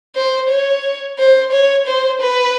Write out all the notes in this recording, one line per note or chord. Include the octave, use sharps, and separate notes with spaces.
C5
C#5
C5
C#5
C5
B4